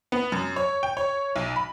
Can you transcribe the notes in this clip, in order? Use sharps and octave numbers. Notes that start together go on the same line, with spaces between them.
B3
F#2
C#5
G5
C#5
B1
B5